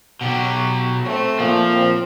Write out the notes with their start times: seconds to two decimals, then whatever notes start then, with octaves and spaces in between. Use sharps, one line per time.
0.21 B2 F#3 G4
1.04 A3 C4
1.39 A#2 F3 A#3
1.71 C4